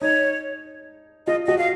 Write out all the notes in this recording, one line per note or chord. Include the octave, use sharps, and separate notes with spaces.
D#4 C#5
F4 D#5
F#4 D#5
F5